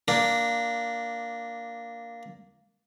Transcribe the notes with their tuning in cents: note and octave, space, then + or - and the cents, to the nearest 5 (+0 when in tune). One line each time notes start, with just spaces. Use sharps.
A#3 +0 D4 +0